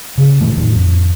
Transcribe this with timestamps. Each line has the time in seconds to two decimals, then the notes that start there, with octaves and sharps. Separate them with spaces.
0.18 C#3
0.41 A#2 D#3 E3 A3
0.57 E2 A2 D#3 F#3
0.76 F2